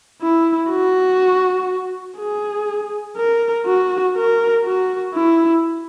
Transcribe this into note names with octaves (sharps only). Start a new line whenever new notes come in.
E4
F#4
G#4
A#4
F#4
A#4
F#4
E4